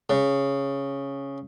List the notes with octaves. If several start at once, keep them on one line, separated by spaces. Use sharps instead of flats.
C#3